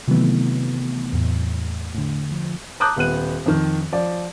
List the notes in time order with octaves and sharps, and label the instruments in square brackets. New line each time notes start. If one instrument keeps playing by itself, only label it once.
[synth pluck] C3 D#3 E3 F#3 A3 B3
E2 A2
A2 D3
F3
[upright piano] A5 A#5 D6 D#6 F#6 G6
D#1 B3 F#6 D#7
F2 D#3
F3 D5